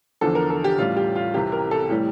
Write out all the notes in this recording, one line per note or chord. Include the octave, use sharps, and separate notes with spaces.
E2 D3 F3 A4
A#4
A4
G4
A1 A2 G3 F4
G4
F4
C2 C3 E3 G4
A#4
A4
A2 E3 G3 G4